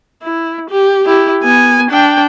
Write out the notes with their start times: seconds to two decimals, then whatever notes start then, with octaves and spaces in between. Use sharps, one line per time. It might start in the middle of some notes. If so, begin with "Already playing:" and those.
0.22 E4
0.70 G4
1.07 E4 G4
1.43 B3 G#5
1.91 D4 G5